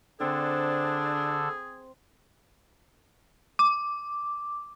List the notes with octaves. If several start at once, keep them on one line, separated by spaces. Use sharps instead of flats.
D3 C4 D4 G#4 A4
D6